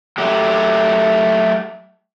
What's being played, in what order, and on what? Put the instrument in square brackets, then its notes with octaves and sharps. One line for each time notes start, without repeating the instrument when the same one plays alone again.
[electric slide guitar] F#3 A3 G4